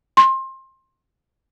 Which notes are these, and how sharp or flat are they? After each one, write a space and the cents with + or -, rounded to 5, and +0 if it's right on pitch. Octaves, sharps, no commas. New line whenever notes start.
C6 +25